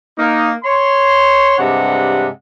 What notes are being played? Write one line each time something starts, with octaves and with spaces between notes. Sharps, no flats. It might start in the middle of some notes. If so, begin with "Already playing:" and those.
A#3 D#4
C#5 C6
G2 C3 G#3 D4 F#5